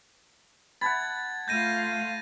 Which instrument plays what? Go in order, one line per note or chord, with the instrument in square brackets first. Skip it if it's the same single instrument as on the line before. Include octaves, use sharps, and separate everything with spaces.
[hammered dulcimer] F#5 A5 B5 [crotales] G#6 A6
[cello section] A3 F4 F5 [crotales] G6 A#6 D#7